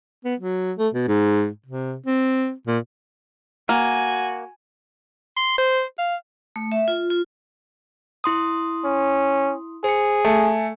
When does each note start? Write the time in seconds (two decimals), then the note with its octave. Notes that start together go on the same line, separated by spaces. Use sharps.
0.25 B3
0.40 F#3
0.79 A3
0.95 B2
1.08 G#2
1.66 C3
2.07 C4
2.67 A#2
3.69 A#3 F#4 G#5
5.37 C6
5.58 C5
5.99 F5
6.56 A3
6.72 E5
6.88 F4
7.10 F4
8.24 E4 C6 D#6
8.84 C#4
9.84 G#4 C5 C#7
10.25 A3 G#5